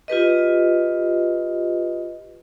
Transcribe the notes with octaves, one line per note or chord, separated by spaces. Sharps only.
F4 G4 B4 D#5